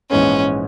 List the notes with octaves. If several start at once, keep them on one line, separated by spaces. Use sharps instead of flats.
A#1 G#2 E3 G#3 B3 C#4